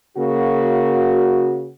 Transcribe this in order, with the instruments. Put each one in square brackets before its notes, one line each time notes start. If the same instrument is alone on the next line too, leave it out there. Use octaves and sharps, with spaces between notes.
[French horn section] C#3 A#3 F#4